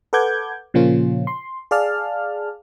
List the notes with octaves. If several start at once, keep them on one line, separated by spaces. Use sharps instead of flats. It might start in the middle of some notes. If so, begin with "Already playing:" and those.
A4 B4 F#5 D6 G6 G#6
A#2 C#3 F3 A#3 C#4 F4
C6
G#4 D5 F5 A5 F6